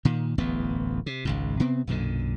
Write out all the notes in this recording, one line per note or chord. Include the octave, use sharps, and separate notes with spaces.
A#2 D#3
D1 A1 E2 B3
C3
G#1 C#2 G#2
C3 B3 C4
B1 F#2 A#2 D3